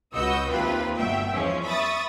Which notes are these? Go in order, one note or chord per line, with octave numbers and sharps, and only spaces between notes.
C#2 F#4 B4 D#5 E6 G6
D#2 C3 C4 F4 B4 B5
G1 B2 E5 G5
E2 F3 G#3 C#4
E5 B5 C#6 D#6 A6